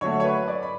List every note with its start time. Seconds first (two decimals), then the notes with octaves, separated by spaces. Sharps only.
0.01 D3 F#3 A3 C#5
0.20 C#5
0.24 B4
0.48 D5
0.62 B5